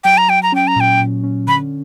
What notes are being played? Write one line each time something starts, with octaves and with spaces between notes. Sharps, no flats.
F#3 G5
A#5
F#3 G5
A#5
C#4 G5
A#5
A#2 G5
A#2
C#4
D3 B5